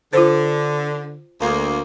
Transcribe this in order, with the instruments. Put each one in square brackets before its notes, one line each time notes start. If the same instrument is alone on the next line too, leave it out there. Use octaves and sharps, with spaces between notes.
[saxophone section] D3 [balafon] F4 C5
[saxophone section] D2 A#3